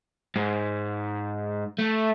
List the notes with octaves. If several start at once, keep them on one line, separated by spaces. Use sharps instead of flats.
G#2
A3